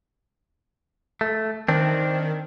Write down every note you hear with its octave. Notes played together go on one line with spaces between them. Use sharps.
A3
D#3 C4 D4